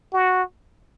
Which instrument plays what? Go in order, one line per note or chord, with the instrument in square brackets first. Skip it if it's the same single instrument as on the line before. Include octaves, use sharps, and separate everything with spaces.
[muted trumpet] F#4